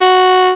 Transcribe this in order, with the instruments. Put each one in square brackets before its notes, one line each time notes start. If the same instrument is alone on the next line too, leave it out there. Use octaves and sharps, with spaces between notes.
[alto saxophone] F#4